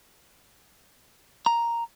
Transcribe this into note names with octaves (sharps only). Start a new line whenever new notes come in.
A#5